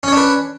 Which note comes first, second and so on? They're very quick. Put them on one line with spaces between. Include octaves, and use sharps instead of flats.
C#4 C#5 D4 B4